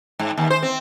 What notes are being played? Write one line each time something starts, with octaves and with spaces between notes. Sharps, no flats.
G#2
D#2
C5
C4